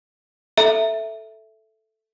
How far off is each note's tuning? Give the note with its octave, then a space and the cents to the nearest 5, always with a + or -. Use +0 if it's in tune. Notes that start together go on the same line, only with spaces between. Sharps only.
A4 +0 E5 +0 A#5 +0